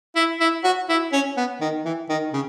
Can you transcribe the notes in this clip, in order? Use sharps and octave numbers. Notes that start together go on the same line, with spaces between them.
E4
E4
F#4
E4
C#4
B3
D#3
E3
D#3
C#3